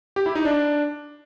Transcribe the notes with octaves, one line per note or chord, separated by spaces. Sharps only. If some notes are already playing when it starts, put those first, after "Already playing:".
G4
E4
D#4
D4